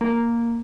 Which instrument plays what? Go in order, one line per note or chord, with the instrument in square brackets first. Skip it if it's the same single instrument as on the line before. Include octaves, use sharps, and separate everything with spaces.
[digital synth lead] A#3